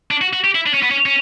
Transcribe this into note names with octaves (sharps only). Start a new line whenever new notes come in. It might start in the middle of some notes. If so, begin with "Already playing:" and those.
D4
F#4
F#4
G4
E4
D4
C#4
B3
C#4
C#4